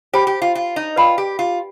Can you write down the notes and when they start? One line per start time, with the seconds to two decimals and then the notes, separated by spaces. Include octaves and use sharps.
0.13 G4 C5 G5 B5
0.27 G4
0.42 F4
0.55 F4
0.76 D#4
0.96 F4 B4 D5 G5 B5
1.18 G4
1.39 F4